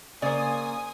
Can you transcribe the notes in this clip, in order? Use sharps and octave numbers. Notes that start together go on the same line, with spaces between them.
C#3 A#3 C5 D5 G#5 D#6